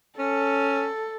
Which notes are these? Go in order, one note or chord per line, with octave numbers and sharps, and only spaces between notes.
C#4 A4